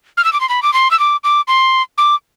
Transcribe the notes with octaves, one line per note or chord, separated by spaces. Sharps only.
F6
E6
D6
C6
B5
D6
C6
E6
D6
D6
C6
D6